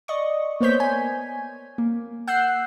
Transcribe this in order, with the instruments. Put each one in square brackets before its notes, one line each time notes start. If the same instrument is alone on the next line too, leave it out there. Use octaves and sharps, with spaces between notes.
[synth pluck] D5 D#5 C#6
A#3 B3 C5 C#5 G6 B6
G#5
A#3
F#5 E6 F#6 G6 C7